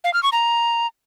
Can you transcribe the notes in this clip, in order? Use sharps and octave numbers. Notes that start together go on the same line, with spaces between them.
F5
F6
C#6
A#5